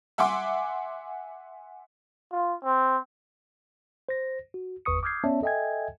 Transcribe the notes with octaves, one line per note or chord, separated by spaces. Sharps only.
E5 F#5 G#5 C6 D6
F4
C4
C5 A#6
F#4
G1 E2 B4 C#6 D#6 C#7
D6 D#6 F6 G6 G#6 C7
B3 C#4 C#5 D5 E5 A5
A4 D#5 E5 G5 G#5 G#6